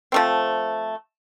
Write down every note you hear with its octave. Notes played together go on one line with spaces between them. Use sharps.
F3 A3 C4